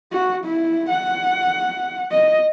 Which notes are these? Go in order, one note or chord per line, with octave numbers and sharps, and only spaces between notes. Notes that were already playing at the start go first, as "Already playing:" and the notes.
F#4
E4
F#5
D#5